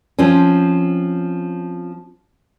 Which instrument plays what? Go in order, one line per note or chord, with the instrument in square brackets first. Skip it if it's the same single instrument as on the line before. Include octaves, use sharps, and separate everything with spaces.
[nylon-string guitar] F3 C4 C#4